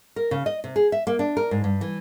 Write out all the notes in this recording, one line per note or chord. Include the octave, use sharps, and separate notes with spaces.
A#4
C#3
D#5
C3
G#4
E5
A#3
D4
A#4
G#2
G2
E3